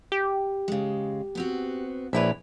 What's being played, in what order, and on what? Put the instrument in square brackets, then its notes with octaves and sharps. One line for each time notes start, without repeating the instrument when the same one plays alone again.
[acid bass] G4
[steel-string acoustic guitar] C#3 G#3
B3 C4 F#4
[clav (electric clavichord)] A#1 E4 B4 [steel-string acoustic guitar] C#5 D5 E5